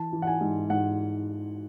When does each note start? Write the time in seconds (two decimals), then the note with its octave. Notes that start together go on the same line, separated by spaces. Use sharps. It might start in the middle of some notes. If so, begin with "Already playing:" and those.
Already playing: E3 A5
0.13 E3
0.22 F#5
0.27 G#5
0.41 G#2
0.70 G#2 F#5